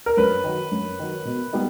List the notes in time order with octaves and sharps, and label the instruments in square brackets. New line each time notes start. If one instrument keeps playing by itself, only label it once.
[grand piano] A#4
[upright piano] F#2 [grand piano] B4
[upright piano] D#3 F#3
F#2
D#3 F#3
B2
G3 B3 D#4